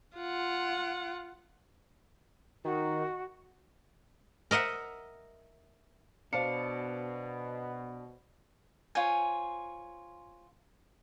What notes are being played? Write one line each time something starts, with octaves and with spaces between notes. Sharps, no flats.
F4 F#5
D#3 F#4
A#4 D#5 E5 F#5
B2 D4 C5 F5 A5 C#7
F4 C5 C#5 G#5